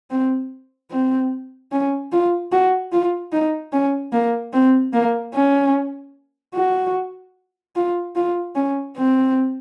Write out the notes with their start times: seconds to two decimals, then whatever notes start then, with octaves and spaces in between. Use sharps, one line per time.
0.10 C4
0.91 C4
1.72 C#4
2.12 F4
2.52 F#4
2.92 F4
3.32 D#4
3.73 C#4
4.13 A#3
4.53 C4
4.93 A#3
5.34 C#4
6.54 F#4
7.75 F4
8.15 F4
8.55 C#4
8.96 C4